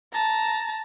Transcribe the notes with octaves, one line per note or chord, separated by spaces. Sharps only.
A5 A#5